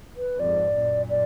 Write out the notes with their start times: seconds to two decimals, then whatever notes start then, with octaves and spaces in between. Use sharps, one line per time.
0.17 B4
0.39 F2 G#2 D5
0.74 F#2 A#2
1.09 D5